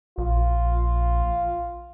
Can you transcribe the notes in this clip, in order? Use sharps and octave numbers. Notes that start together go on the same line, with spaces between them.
A#1 F4